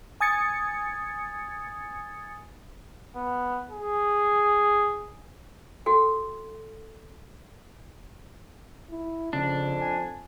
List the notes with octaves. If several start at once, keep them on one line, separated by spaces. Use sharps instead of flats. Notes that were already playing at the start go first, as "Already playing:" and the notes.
G#5 D#6 G#6 A6 C#7
B3
G#4
F#4 A4 G5
E4
F2 C#3 D4
G#5